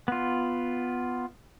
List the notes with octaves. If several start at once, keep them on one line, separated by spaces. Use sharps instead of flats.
B3 F4